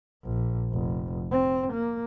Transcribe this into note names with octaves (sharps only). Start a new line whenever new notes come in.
A#1
F1
C4
A#3